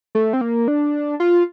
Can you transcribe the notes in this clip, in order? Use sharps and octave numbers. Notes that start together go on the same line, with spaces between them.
A3
C4
A#3
D4
F4